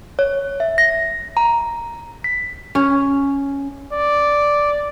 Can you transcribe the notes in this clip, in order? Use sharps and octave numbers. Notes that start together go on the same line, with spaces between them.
C#5
E5
A#6
A#5
B6
C#4
D5